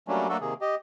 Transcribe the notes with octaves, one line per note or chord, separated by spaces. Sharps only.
F#3 G3 A3 A#3 C#4 D4
F#3 A3 A#3 D4 F#4 A4
C3 D#3 A#3 G#4
G4 D#5